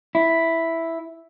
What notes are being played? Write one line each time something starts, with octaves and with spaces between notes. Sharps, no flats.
E4